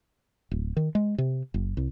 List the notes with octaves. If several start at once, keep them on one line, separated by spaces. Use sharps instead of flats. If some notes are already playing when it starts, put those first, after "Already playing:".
D1
D#3
G#3
C3
F#1
C2